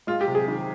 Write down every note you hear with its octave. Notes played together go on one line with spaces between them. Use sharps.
G#3 F4
G4
C3
G#4
D#3